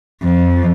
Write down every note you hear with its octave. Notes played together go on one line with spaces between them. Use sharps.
F2